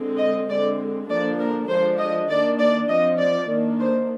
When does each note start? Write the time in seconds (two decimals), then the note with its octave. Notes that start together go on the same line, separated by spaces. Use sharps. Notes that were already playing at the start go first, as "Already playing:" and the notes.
Already playing: D3 G#3 C4
0.18 D#5
0.49 D3 G#3 C4 D5
1.08 D3 F3 A#3 D4 D5
1.39 A#4
1.69 F3 G#3 D4 C5
1.99 D#5
2.29 D#3 A#3 D4 D5
2.59 D5
2.88 F3 C4 D#5
3.19 D5
3.49 D#3 A#3 D4
3.79 C5